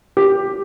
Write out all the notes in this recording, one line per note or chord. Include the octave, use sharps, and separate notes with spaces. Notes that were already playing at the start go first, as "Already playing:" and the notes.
G4